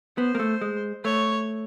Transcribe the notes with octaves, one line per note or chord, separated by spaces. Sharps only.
B3 C5
A#3
A3
G#3
A3 C#5